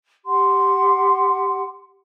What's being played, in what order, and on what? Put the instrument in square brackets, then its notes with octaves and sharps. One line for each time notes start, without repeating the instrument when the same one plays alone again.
[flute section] G4 F#5 C6